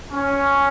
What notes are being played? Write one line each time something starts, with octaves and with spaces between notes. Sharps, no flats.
C#4